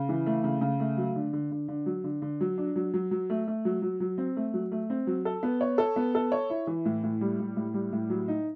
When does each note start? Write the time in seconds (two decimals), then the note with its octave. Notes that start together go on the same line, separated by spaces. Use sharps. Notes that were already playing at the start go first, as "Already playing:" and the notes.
Already playing: C#3
0.09 E3
0.26 A3
0.44 C#3
0.61 C#3
0.80 A3
0.98 F#3
1.15 D3
1.33 D3
1.51 D3
1.68 D3
1.86 F#3
2.04 D3
2.22 D3
2.41 F#3
2.58 D4
2.76 F#3
2.94 F#3
3.11 F#3
3.30 A3
3.47 A3
3.65 F#3
3.82 F#3
4.00 F#3
4.18 C4
4.37 A3
4.54 F#3
4.72 A3
4.90 C4
5.07 F#3
5.25 A4
5.43 B3
5.61 C#5
5.78 A4
5.96 B3
6.15 A4
6.32 C#5
6.50 E4
6.67 E3
6.85 A2
7.04 A2
7.21 G3
7.40 A2
7.57 A2
7.74 G3
7.92 A2
8.10 F#3
8.28 D#4